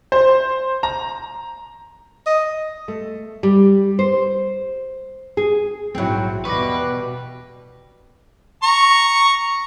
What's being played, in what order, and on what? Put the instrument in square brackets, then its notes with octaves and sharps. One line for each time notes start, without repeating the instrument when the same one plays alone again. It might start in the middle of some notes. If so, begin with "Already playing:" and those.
[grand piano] C5
A#5
[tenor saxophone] D#5
[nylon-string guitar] A3
G3
C5
G#4
[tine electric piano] A#1 G#2 E4 [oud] F#3 C4
[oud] E2 [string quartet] B2 G3 [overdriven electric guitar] B4 [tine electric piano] C#6 D6 A#6
[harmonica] A#5 C#6